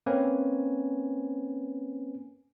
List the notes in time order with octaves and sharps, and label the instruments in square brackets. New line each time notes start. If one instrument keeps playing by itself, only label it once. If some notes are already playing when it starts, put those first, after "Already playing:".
[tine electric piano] A#3 C4 C#4 B4 G#5